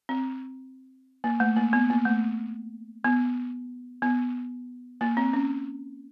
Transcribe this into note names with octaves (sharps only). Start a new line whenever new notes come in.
C4
A#3
A3
A#3
B3
A#3
A3
B3
B3
A#3
C4
C#4